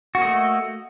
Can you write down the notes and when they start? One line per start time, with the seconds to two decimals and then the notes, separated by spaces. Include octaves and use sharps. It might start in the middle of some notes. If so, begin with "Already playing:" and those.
0.15 F#4
0.18 A#3
0.22 D#5
0.25 A3